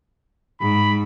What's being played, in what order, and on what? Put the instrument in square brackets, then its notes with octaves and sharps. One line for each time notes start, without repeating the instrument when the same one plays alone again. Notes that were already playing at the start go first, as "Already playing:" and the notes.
[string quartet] G#2 [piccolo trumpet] B5